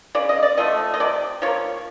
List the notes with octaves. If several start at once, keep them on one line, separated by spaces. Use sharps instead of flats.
C#3 D5
D#5
D5
F3 A3 D#5
D#5
C3 D5
F3 A#3 C#5